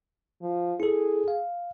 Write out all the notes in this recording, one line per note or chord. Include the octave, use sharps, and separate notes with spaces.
F3
E4 G#4 A4
F5